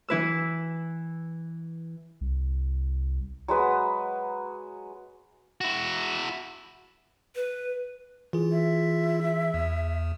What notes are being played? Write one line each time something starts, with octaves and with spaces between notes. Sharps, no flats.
E3 E4 B4 E6
C2
F#3 G#3 B4 D#6
E4 F#4
B4
E3 F4 G#4
E5
E2